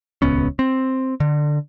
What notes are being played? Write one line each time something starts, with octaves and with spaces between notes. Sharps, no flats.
D#1 C#2 B3 C#4
C4
D3